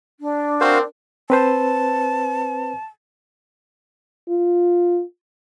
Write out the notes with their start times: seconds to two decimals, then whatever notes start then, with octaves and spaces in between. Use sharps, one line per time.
0.20 D4
0.61 C4 F#4 A#4 C5 F5
1.30 C4 B4 C5 A5
4.29 F4